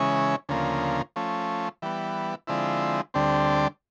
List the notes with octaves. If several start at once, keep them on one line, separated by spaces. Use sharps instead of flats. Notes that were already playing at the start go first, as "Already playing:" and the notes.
Already playing: C#3 E3 G#3 C#4
D2 C#3 F3 A#3
F3 A3 C#4
E3 G3 B3
D3 F3 G#3 C4 E4
D2 D3 G3 C4